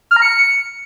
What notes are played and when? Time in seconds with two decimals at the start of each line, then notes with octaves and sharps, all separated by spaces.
0.11 F6
0.16 A#5
0.22 C#7